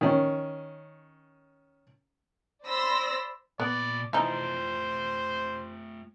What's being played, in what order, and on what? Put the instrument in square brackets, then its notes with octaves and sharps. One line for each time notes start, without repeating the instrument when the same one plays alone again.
[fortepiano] D#3 C#4
[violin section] C5 D5 B5 C6 E6 A#6
[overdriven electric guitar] A#2 B5 [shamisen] B3 [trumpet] D5
[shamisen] E3 F3 D#4 [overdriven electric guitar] A3 F4 [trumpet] C5